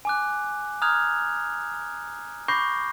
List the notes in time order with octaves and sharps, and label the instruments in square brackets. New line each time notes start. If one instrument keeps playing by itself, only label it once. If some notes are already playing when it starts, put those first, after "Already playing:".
[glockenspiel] G#5 D6 F#6
A#5 D#6 F6 F#6 G#6 F7
B5 C#6 D6 G6 A#6 C7